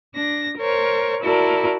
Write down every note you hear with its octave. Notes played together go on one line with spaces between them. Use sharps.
D4 A#6
A#4 C5 C#5
E4 F#4 A4 A#4 D5